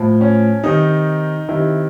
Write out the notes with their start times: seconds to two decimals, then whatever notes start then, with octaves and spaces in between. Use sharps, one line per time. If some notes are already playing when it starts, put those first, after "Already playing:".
Already playing: A2 F3
0.21 C#4
0.63 C3 D#3 D#4
1.48 C3 D#3 E4